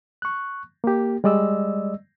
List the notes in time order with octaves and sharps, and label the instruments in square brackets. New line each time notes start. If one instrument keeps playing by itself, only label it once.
[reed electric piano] C#6 F#6
A#3 G4
G3 G#3 D5 D#5 E6